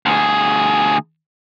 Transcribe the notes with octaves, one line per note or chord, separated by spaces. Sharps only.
D2 G#4